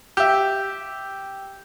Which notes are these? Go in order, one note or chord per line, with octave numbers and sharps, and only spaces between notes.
G4 E5